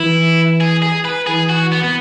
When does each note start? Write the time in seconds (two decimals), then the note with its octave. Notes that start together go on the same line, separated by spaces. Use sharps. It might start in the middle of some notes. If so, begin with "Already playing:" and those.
Already playing: E3 E4
0.61 G#4
0.83 G#4
1.05 B4
1.27 E3 G#4
1.49 F#4
1.72 B3
1.83 B3